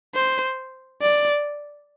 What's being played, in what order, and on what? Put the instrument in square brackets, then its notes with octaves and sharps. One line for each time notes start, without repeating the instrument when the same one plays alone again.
[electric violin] C5
D5